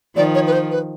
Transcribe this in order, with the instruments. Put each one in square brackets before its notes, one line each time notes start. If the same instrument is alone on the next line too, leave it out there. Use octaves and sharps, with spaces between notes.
[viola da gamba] D#3 F3 [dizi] D5
[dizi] C#5
B4
C5
B4